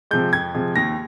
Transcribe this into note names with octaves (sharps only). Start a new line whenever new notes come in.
C3 F3 G#3 G6
F2 G#6
C3 F3 G#3
D#2 A#6